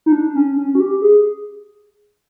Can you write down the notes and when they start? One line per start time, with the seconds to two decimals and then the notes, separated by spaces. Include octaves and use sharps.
0.06 D#4
0.12 D4
0.35 C#4
0.58 C#4
0.75 F#4
0.80 G4
1.02 G#4